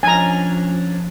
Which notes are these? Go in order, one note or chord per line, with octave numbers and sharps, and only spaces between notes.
F3 C#4 D4 G#5 A#5